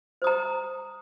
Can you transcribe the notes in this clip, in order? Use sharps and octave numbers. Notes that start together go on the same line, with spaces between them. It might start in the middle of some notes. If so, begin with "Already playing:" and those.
C5 A#5 D#6